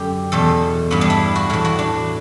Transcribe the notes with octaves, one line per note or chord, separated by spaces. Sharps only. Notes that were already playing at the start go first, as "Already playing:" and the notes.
Already playing: F#2 D3 G4
E2 B2 A4
G2 E3 B3
D4
E4
F#4
A2 E3 E4
F#4
D4